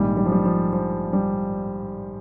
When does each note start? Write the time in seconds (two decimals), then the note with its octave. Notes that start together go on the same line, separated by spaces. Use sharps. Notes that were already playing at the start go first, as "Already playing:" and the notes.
Already playing: A#1 G#2 D#3 G3
0.17 G3
0.26 F3
0.32 G3
0.46 F3
0.73 F3
1.13 G3